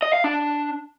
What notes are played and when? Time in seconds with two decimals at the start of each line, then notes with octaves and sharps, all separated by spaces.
0.02 D#5
0.13 F5
0.24 D4